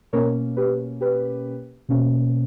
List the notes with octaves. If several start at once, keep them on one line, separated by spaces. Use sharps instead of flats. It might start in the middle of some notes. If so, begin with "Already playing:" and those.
B2 A#3 C#4 A#4 C#5
G4 B4
G4 B4
B2 A#3 C#4